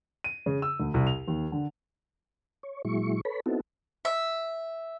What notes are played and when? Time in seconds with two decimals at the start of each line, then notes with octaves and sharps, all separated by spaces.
0.24 D#7
0.46 C#3
0.62 E6
0.80 D2
0.94 C2
1.07 F7
1.28 D#2
1.52 D3
2.63 C#5
2.85 A#2 F#3 G#3 E4 C#6
3.25 A4 B4 C#5 B5
3.46 B3 C4 D#4 E4 F#4 A4
4.05 E5